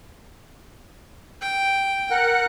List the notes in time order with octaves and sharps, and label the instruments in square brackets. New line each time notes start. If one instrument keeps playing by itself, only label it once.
[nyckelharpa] G5
[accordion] A#4 F#5 F#6